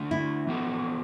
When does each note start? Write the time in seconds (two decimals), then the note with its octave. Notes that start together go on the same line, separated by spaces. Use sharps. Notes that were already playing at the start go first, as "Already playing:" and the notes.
Already playing: D3 A3 D4 F#4
0.11 E4
0.47 E3 B3 F#4 A4